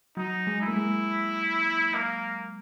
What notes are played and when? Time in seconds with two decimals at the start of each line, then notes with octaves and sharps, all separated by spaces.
0.17 F#3 D#4
0.47 G#3
0.61 E4
0.68 A#3
0.76 G#3
1.94 A#3